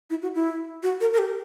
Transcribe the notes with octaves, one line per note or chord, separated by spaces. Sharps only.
E4
F#4
E4
F#4
A#4
A#4
G4